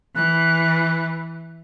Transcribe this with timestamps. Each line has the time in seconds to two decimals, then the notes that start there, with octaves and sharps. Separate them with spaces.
0.16 E3 F#6